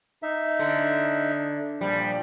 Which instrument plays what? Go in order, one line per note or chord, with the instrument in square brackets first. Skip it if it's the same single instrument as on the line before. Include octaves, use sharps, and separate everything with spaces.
[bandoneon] D#4 E5
[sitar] D3
[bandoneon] A#2 F3 [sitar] G3